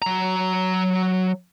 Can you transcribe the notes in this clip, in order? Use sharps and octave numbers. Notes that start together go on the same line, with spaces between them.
F#3 A#5